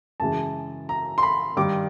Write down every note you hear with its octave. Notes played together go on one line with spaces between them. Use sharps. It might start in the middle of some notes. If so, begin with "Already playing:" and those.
F#2 C#3 E3 G#3 A5
A#5
C6
B5
G2 D#3 G3 D6